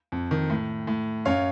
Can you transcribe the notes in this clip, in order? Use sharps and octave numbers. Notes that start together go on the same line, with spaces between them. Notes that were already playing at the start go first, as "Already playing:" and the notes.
F2
D#3
A2
A2
F#2 C#5 F5